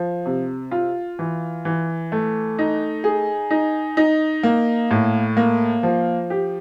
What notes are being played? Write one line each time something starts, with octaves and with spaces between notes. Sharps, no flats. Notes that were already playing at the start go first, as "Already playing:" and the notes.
Already playing: F3
C3
F4
E3
E3
A3
D#4
G#4
D#4
D#4
A#3
A2
A#3
F3
G4